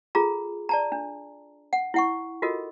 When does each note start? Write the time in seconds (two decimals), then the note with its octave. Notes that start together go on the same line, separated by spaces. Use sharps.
0.15 F4 G#4 A4 A#5
0.69 D5 A5 A#5
0.92 D4
1.73 F#5
1.94 E4 F#5 C#6
2.42 F4 F#4 A4 A#4 D#5